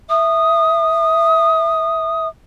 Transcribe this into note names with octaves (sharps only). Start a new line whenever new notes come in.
E5 D#6